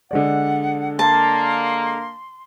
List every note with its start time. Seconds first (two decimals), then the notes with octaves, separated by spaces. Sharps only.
0.11 D3 G#3 D5 F#5
0.99 A#3 A5 C6